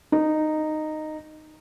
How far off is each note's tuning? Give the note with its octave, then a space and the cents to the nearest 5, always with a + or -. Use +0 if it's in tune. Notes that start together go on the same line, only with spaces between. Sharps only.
D#4 -10